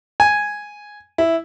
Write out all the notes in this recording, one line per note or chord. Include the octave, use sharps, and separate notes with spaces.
G#5
E4